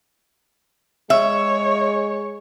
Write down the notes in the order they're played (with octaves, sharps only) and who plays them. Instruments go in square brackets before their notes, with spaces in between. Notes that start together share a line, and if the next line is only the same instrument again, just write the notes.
[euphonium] G#3 [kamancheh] C#5 [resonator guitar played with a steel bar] E5